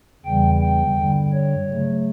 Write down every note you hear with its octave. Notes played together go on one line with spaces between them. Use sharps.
E2 C#3 E3 G3 G5
G5
G2 D3 G3
C#5
C#3 F#3 A3